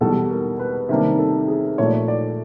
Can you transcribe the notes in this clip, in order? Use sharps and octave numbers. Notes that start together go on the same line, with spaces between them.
E2 B2 G3 A4
A#4
B4
C3 D#3 G3 A#3 D4 A#4
A4
G#4
A#2 F3 A3 C#4 C#5
D5
C#5
D5